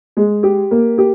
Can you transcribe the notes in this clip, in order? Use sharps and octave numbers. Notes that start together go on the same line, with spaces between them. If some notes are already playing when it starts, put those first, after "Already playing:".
G#3
G4
A#3
G4